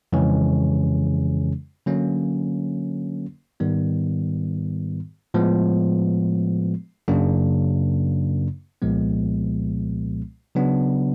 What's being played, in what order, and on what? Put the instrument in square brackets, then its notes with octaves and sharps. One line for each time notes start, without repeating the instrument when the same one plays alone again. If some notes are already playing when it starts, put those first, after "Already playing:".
[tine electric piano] F2 C#3 E3 G#3 C#4
D3 F#3 A#3 C#4
G#2 D#3 G3 B3
A2 F3 G#3 B3
F#2 C#3 F#3 A#3 D4
C2 A#2 F3 G#3 B3
C#3 F#3 B3 D4